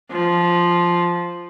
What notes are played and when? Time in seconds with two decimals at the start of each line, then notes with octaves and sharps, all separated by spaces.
0.11 F3